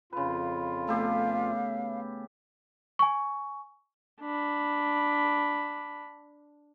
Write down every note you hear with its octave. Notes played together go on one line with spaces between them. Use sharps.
F2 C#3 F4 B4
A3 B3 G4 A4 F5
G#5 C#6
D4 B5